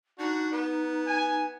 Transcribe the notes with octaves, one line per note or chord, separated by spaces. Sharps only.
D4 D#4 F#4 F#5
B3
G#5